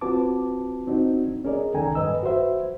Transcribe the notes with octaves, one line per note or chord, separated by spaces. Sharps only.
C4 F4 F#4 B4 A5 D6
C4 D4 D#4 F#4
C#4 G#4 A#4 D5 D#5
C2 D#3 A4 G5 G#5 A#5
G2 B4 D#5 E6
F#4 B4 C5 E5